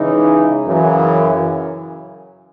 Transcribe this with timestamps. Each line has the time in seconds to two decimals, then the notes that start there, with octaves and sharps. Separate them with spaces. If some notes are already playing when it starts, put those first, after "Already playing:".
Already playing: C#3 E3 G#3 D#4
0.65 F#2 C#3 E3